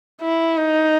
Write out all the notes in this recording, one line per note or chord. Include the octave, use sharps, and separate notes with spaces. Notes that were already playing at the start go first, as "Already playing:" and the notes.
E4
D#4